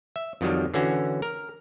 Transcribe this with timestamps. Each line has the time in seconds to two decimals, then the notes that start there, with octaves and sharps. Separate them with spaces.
0.16 E5
0.41 F2 D#3 F#3 G3
0.74 D3 E3 C#4 F#4
1.22 A#4